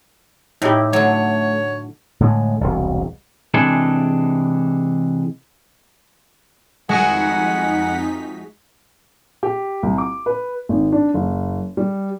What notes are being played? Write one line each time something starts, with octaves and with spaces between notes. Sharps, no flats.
A2 D#4 E4 G4
D3 F#3 A3 C#5
A2 D3 G#3
E1 C2
C3 E3 G#3 D4 G#4 A4
F2 G#3 D#4 E4 F#4 G#4 F#5 B6
G4
C2
D6
B4
G#1
D4
F#1
G3